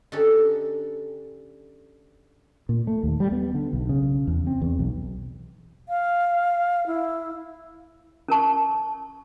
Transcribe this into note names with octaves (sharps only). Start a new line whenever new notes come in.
D3 C#4 D#4 G4 A4
A#2
A3
D#2
G3
B3
D3
B1
C#3
E2
C4
E2
B1
F5
E4
C#4 A#4 A5 C#6